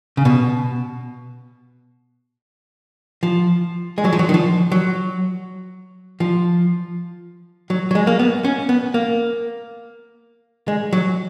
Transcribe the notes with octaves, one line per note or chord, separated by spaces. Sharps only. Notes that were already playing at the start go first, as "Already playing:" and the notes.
C#3
B2
F3
G#3
F#3
F3
F#3
D#3
F3
F#3
F3
F#3
F#3
G#3
A#3
B3
C#4
B3
A#3
G#3
F#3